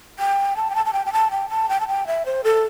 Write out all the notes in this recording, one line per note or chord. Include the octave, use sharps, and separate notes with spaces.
G5
A5
G5
A5
A5
G5
G5
A5
G5
A5
G5
A5
G5
E5
C5
A4